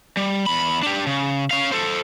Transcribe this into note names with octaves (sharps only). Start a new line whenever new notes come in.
G3
E2 B5
D4 G4
C#3
C#4 F5
A4 C5